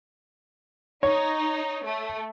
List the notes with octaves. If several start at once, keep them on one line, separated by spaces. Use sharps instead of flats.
D#4 C#5
A3